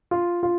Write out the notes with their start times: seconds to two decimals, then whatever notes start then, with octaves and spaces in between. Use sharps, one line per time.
0.11 F4
0.43 F4